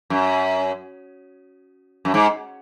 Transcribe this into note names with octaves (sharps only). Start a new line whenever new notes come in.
F#2
F#2
G#2